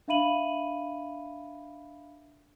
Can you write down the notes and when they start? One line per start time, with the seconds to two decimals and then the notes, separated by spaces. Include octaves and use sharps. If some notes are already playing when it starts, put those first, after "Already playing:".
0.08 D4 E5 F5 B5 D#7 F#7